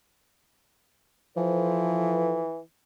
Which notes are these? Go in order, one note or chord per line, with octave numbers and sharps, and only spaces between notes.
E3 F3 A4 B4 C5